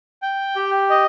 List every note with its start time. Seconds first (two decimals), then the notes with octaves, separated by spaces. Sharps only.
0.22 G5
0.56 G4
0.90 D#5